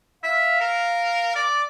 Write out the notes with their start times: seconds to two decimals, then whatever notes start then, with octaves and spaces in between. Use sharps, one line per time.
0.23 E5 F5
0.61 A#4
1.36 D5 D6